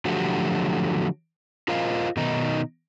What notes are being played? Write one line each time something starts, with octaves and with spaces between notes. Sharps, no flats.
D3 F3 F#3 A3 F#4 G4
F4 A#4 C5 D#5 F5
B2 D#3 D#4